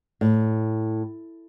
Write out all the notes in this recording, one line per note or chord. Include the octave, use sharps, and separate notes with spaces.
A2